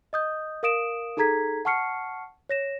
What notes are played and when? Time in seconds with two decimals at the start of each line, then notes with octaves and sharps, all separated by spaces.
0.13 D#5 D#6 G6
0.63 A#4 F5 D#6 D7 E7
1.17 D#4 G#4 A4 A#5 G#6 B6
1.65 F#5 A5 C#6 F6 C7 C#7
2.49 C#5 A#6 E7